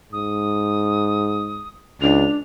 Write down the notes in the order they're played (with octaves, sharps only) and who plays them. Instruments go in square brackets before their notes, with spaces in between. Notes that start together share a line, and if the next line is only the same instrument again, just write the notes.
[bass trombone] G#2 [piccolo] D#6
[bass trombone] C#2 [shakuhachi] D4 [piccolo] F7